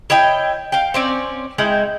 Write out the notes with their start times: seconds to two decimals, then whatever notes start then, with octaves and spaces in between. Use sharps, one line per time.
0.10 E4 C#5 D#5 G5
0.72 F5 G5
0.94 C4 C#4 D5
1.58 G#3 D#4 E4 G5